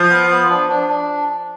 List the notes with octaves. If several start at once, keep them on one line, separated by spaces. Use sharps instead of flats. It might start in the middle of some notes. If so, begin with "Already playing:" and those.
Already playing: F3
B3
B3
D4
D4
D4